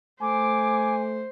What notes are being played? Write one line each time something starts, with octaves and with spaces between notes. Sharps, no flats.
A3 C5 G#5 D6